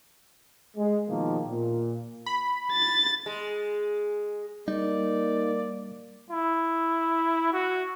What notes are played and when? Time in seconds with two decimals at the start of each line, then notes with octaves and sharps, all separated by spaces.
0.76 G#3
1.08 B2 D#3 F3 A#3
1.46 A#2
2.26 B5
2.72 A6
3.26 G#3
4.68 G3 A#3 D#4 D5
6.30 E4
7.53 F#4